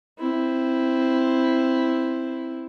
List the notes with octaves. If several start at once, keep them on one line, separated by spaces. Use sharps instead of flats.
C4 E4